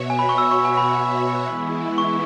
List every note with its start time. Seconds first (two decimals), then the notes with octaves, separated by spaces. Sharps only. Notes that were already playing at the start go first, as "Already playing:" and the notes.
Already playing: B2 B3 F#4 C#5 E5
0.10 G#5
0.19 B5
0.29 C#6
0.38 E6
0.51 C#6
0.65 G#5
0.77 B5
1.45 E3 G#3 B3 E4
1.98 C#6